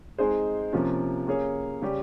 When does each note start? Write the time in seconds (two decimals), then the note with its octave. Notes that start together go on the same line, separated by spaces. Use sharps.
0.18 G#3 C4 D#4 G#4 C5
0.73 C3 F3 A#3 C#4 F4
1.27 A#3 C#4 G#4 C#5
1.82 C#3 G3 C#4 G4